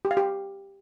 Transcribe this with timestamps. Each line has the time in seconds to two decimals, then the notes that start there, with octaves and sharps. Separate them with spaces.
0.05 G4
0.11 F5
0.17 G4